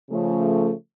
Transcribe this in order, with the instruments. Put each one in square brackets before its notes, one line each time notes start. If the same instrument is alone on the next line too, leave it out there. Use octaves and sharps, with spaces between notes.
[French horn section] C#3 F3 A3